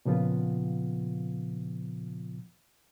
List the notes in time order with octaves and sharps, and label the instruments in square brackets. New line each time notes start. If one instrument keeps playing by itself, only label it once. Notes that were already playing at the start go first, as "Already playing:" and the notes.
[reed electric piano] A#2 C#3 F3 B3 F4